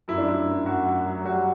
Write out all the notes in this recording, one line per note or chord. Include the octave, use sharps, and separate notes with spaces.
F#2 E4
D4
F#2 E4
F#2
F#2 F#4
F#2
F#3
G3 F#4